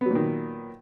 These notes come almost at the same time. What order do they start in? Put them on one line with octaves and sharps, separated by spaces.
B3 F#3 A#2 D#3